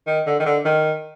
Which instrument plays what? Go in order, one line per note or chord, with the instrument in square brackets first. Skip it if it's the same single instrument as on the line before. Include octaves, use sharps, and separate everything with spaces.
[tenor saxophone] D#3
D3
D#3
D3
D#3